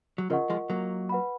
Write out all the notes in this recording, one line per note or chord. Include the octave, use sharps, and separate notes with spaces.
F#3
C#3 F3 F4 A#4 D#5 F#5 C#6
F3 G#3
F#3 A#3
B4 F#5 B5